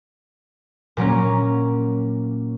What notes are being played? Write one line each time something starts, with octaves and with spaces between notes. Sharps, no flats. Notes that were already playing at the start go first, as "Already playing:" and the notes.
A#2 F#3 A#3 C#4